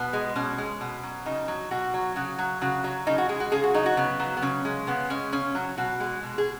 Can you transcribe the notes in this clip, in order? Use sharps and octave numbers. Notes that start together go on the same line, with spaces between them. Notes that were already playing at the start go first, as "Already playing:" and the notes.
Already playing: B2 B3
G#3
B2 C#4
G#3
B2
F#3
C#3 D#4
F#3
B2 F#4
F#3
C#3 F#4
F#3
C#3 F#4
F#3
C#3 D#4
F#4
G#3 G#4
F#4
C#3 G#4
F#4
F#3 D#4
F#4
C#3 B3
F#3
B3
C#3 C#4
G#3
C#3 B3
G#3 C#4
C#3 C#4
F#3
B2 F#4
G#3
B2
G#4